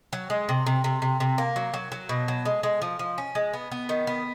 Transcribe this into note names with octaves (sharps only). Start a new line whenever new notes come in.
F#3
G#3
C3
C3
C3
C3
C3
A#3
F#3
F#3
F#3
B2
F#3
G#3
G#3
F3
F3
C#4
G#3
B3
B3
D#3
B3